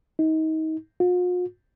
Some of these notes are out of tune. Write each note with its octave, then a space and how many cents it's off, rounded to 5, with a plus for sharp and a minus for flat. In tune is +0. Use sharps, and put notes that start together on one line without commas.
D#4 +30
F4 +45